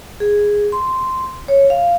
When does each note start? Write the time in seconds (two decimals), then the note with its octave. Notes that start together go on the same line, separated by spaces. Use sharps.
0.20 G#4
0.72 C6
1.48 C#5
1.70 F5